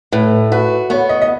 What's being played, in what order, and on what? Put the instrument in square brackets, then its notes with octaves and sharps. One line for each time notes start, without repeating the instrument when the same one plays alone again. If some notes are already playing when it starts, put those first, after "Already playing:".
[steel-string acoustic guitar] A2 [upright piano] B4
[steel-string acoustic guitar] F#4 [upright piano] B4
[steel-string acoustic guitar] B3 [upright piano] C#5
[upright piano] D#5
D#5